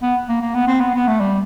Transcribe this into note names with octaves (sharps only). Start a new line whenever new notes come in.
B3
A#3
A#3
B3
C4
B3
B3
A3
G3